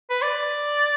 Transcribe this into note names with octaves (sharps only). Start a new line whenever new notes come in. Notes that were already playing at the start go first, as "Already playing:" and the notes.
B4
D5